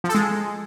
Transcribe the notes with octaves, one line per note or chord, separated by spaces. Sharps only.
F3
A4
G#3